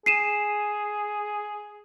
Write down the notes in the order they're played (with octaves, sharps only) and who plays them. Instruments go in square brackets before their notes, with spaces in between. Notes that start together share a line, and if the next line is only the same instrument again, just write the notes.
[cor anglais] G#4 [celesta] C7 D#7 E7